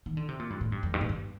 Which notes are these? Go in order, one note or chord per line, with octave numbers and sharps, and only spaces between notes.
D#3
D3
C3
A#2
G2
A2
G2
F2
G2
A2
G2